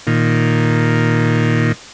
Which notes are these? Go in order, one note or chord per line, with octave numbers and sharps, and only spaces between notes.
A#2 D#3